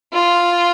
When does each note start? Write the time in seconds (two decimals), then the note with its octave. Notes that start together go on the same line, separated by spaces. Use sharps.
0.13 F4